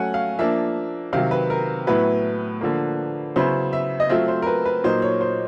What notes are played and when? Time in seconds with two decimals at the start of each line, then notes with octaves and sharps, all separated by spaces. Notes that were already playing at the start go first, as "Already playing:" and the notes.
Already playing: F#3 A3 C#4 F#5 G#5
0.14 F5
0.39 F3 A#3 D4 E5
1.13 C3 D#3 F#3 F5
1.31 B4
1.50 A#4
1.87 A2 F#3 B3 E4 B4
2.61 D3 F3 A#3
3.36 C#3 F#3 B3 E4 C5
3.73 E5
4.00 D#5
4.09 F#3 A3 C4 F4 E5
4.28 C5
4.42 A#4
4.47 B4
4.65 B4
4.84 A#2 F#3 A#3 D#4 C5
5.02 C#5
5.21 C5